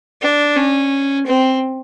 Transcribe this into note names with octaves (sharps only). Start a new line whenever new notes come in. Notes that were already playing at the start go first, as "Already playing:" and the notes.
D4
C#4
C4